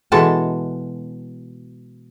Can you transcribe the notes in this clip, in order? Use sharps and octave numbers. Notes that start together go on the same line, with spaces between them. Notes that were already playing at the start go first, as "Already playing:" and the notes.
B2 E3 G#3 A4 A5